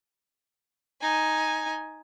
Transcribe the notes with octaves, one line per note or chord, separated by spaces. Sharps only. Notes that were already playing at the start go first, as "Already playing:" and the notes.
D#4 G#5